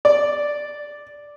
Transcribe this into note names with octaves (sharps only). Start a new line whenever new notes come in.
D5